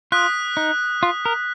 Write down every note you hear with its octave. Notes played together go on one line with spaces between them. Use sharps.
F4 D#6 F#6 B6
D#4
F4
A#4